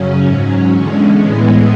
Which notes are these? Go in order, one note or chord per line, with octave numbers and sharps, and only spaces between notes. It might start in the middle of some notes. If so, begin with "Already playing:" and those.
Already playing: F#2 C#3 F#3 C#4
G#2 F#3 C#4
E2 D3 G#3
A2 E3 G#3 B3